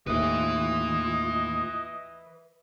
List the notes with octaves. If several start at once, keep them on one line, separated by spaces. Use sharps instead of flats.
D#2 A2 F4 B4 D#5 E5